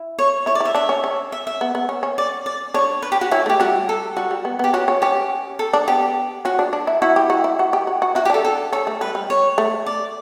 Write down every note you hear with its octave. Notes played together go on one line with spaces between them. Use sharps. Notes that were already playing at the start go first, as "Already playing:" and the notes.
Already playing: E4
C#5
E4 C#5
D5
E4 E5
D4 E5
C#4
C#4
E5
E5
B3
B3
C#4
C#4
D5
D5
D4 C#5
B4
G4
F#4
C#4 E4
A3 G4
G3 F#4
A4
G3 F#4
G3
B3
B3 G4
C#4 F#4
C#4
C#4 G4
A4
D4
B3 G4
C#4 F#4
D4
D4
E4
E4 F#4
G4
F#4
E4
F#4
G4
F#4
F#4
E4 F#4
G4
D4 A4
A4
C#4 A4
A3
G3 B4
G3
C#5
A3
D5